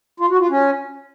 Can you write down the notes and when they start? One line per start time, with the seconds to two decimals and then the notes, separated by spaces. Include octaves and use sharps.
0.20 F4
0.30 F#4
0.40 F4
0.50 C#4